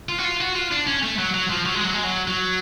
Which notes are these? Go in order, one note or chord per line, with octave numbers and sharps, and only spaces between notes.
F4
F#4
F4
F#4
F4
D4
C#4
A3
F#3
F#3
F3
F#3
G#3
F#3
G#3
F#3
F#3